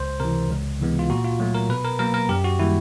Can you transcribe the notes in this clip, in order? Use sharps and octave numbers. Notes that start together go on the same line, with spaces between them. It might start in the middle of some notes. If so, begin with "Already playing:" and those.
Already playing: C#2 C5
C3 E3 A#4
C#2
C3 E3 G#3 B3
F4
A#2 F#4
F4
F#3 A3
A#4
B2 B4
A#4
F#3 A#3 A#4
A#4
F#2 G4
F#4
D#3 G3 A#3 E4